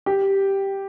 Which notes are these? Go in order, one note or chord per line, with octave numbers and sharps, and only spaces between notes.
G4